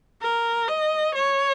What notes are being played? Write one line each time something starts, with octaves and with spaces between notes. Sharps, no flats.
A#4
D#5
C#5